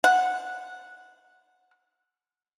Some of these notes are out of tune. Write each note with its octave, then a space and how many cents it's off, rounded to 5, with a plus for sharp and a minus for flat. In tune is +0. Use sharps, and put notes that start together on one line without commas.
F#5 -10